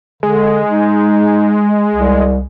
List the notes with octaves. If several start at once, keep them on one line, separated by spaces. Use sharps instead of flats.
D3 G#3
D#4
C2